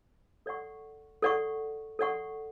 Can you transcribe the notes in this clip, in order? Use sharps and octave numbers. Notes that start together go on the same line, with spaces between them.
A4 D5 F#5 C#6
A4 D5 F#5 C#6
A4 D5 F#5 C#6